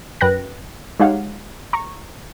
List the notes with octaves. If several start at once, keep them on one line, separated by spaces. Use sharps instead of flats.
F#2 B4 G5 F#6 A#6
G#3 D#4 G4 C#5 F5 F#5
A#5 C#6